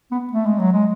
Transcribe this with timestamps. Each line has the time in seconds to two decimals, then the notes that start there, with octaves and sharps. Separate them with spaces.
0.11 B3
0.33 A3
0.46 G#3
0.59 F#3
0.72 G#3